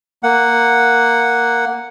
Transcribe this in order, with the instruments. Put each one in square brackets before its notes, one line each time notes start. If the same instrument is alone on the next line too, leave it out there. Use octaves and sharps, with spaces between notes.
[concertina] A#3 F#5